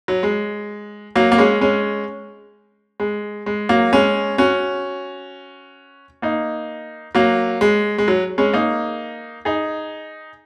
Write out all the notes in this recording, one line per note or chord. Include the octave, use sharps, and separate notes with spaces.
F#3
G#3
F#3 A#3
A#3
G#3 C#4
G#3 C#4
G#3
G#3
F#3 A#3
G#3 C#4
C#4 F#4
A#3 D#4
F#3 A#3
G#3
G#3
F#3
G#3 C#4
A#3 D#4
D#4 G#4